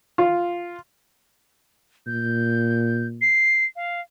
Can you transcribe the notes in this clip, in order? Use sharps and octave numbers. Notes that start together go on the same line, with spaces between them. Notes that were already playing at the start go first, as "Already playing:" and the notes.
F4
A#2 G6
C7
F5